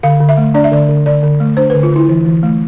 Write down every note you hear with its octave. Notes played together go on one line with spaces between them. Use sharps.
D3 F5
D3
E5
A3
D4 D5
E5
D3 D5
D3
D3 D5
D3
A3
D4 C5
B4
D3
F4
D3 E4
E3
E3
A3